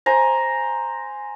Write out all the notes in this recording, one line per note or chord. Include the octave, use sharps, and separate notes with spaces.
C5 G#5 A#5